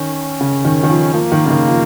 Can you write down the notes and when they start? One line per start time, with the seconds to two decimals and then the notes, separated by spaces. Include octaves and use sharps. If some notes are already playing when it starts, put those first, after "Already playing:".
Already playing: D#3 C#4
0.41 C#3
0.65 D#3
0.83 D#3
0.90 F3
1.14 F3 A#3
1.32 D#3
1.46 C#3
1.50 D#3
1.68 F3